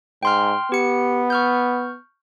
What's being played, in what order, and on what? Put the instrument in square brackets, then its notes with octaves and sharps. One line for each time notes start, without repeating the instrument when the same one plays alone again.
[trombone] G#2 [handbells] G5 C6 F6
[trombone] B3 [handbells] G4 C#7
[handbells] C#6 F6 G6